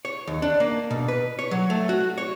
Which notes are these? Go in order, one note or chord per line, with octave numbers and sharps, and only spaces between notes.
C#5
D#2
D4
A#3
B2
B4
C#5
F#3
A3
F#4
C#5